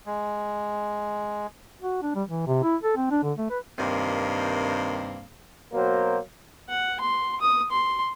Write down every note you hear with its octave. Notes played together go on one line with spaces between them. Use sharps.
G#3
F#4
D4
G3
E3
C3
E4
A4
C4
D4
D3
A3
B4
G2 C3 D#3 A#3 C4
B2 F#3 A#3 A#4 C5
F#5
C6
D#6
C6